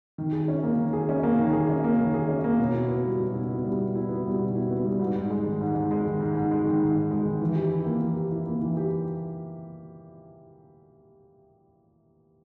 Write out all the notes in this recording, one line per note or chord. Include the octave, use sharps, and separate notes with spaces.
D#3
G#4
C#4
A#3
D#3
G#4
C#4
A#3
D#3
G#4
C#4
A#3
D#3
G#4
C#4
A#3
B2
E4
B3
G3
B2
E4
B3
G3
B2
E4
B3
G3
B2
E4
B3
G3
G#2
G#2
G#3
D#3
G#2
G#2
G#3
D#3
G#2
G#2
G#3
D#3
G#2
G#2
G#3
D#3
E3
G4
E4
A#3
E3
G4
E4
A#3
E3
G4